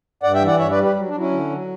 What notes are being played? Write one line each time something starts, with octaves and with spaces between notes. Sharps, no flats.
G2 D5 F#5
E5 G5
E3
D5 F#5
G2 C#5 E5
B4 D5
G3
G4 B4
F#3
D4
F#3
C#4 E4
D3
F#3